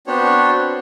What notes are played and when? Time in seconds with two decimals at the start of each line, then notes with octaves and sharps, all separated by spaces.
0.07 B3 C4 D4 F#4 C#5